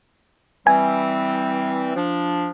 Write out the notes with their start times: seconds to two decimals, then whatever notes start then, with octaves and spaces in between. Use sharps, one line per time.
0.67 E3 G3 C4 G#5
1.96 F3 D4